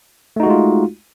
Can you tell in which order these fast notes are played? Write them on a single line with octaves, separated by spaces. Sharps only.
A3 D#4 F#4 G#3 F4